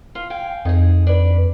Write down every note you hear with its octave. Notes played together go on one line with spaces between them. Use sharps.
F4
F5 G5 G#5
F2 D#4 G#4
D4 B4